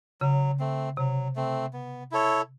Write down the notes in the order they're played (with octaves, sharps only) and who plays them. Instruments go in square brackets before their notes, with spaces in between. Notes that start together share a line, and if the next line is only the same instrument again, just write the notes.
[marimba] C#3 [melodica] F#3
[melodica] A3 C4
[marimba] C3 [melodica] F#3
[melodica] A3 C4
B3
E4 A4 C#5